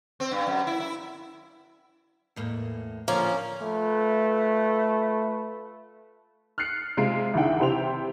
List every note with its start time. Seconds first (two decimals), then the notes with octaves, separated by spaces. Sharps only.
0.20 C4
0.31 G2
0.47 F#2
0.67 E4
0.80 E4
2.36 E2 A2 A#3
3.08 A#2 D3 F3 A#3 C#4
3.62 A3 F4 B4
6.58 F6 F#6 A6 C7 C#7
6.97 C3 G#3 F4 C7 D7
7.34 C2 D#3 E3 D4 F#5 G5
7.60 C3 E4 G4 C5 G5 F7